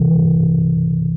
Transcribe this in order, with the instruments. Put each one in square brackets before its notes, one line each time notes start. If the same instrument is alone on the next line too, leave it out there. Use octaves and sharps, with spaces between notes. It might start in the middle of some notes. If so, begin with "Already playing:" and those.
Already playing: [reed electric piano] C2 C3 E3